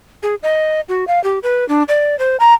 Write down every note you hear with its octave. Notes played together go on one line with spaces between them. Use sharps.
G#4
D#5
F#4
F5
G4
B4
D4
D5
C5
A#5